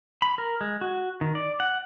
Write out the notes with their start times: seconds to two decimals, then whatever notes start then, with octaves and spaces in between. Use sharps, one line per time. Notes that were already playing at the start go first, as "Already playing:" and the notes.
0.22 B5
0.38 A#4
0.61 G#3
0.81 F#4
1.21 D#3
1.35 D5
1.60 F#5